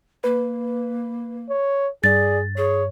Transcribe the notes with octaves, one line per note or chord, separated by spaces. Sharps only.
A#3 B4
C#5
G2 G#4 D5 A6
G#4 C#5